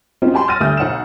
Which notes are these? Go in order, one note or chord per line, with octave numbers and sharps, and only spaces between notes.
F#3 C4 C#4 D#4 F4
G4 G#5 A5 B5 C6
E6 F6 A6 A#6 D#7
D2 G3 A3 D5 D#6 G6
B1 F#5 E6 E7